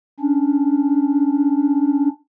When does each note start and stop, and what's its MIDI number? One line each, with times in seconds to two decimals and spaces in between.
0.20 2.08 61
0.20 2.08 62